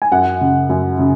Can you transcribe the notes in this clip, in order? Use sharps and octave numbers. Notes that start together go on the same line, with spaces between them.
G#5
F#2 F#5
C#3
F#2
C#3